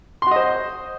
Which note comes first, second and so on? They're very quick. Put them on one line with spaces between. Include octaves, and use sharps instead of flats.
C6 F#4 D#5 C5